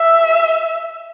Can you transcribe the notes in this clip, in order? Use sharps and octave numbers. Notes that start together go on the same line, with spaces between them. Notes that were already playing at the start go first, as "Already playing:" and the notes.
Already playing: E5